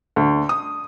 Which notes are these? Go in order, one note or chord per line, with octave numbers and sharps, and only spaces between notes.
D2
D#6